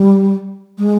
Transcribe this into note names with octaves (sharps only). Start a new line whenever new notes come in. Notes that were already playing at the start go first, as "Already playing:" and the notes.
Already playing: G3
G#3